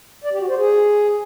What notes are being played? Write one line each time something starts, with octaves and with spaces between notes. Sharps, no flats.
D5
G4
F#4
C5
G#4